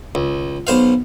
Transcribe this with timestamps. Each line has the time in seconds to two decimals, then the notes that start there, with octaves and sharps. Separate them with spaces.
0.15 C#2
0.67 B1 C5 F5